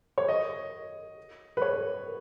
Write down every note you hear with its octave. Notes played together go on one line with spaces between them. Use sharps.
C#5
D#5
B4
C#5